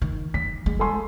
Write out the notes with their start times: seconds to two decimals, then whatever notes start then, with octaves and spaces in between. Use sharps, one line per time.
0.02 D#3
0.34 D#3 B6
0.66 G#3
0.79 A4 G#5 C6